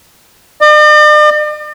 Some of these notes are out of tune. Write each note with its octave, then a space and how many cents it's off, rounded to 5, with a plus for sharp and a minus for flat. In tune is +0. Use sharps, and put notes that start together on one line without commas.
D5 +45